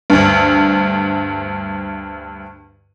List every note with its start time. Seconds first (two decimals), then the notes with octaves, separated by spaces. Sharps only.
0.10 D2 G2